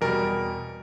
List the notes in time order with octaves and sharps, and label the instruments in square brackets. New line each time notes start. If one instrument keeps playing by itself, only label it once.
[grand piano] E2 B2 G3 A#4